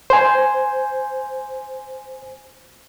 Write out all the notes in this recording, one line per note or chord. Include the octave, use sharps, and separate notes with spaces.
C5 G#5